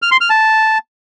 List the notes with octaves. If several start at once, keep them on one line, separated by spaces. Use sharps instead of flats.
F6
C6
F6
A5